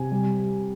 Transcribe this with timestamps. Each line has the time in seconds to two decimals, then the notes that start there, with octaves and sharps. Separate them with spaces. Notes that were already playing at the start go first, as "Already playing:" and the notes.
Already playing: C3 G#5
0.12 G3